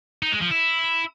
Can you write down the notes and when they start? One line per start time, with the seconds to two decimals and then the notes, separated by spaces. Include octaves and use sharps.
0.22 D#4
0.32 G#3
0.41 F3
0.51 E4